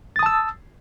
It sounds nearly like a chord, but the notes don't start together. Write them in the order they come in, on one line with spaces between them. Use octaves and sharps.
A6 D#6 A5 E6